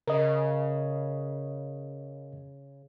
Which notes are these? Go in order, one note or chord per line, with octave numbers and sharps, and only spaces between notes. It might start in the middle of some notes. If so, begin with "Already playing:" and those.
C#3 A#4 D#5